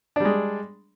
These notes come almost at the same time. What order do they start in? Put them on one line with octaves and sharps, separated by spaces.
D4 G3 G#3